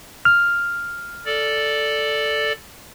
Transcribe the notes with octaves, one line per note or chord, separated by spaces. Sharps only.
F6
A4 D5